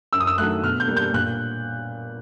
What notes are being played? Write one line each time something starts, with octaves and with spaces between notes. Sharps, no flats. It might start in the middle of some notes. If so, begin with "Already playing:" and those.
F#2 E6
D#6
E6
D#3 F#3 A3 F#6
B2 F6
G6
G3 A#3
G6
A#2 F#6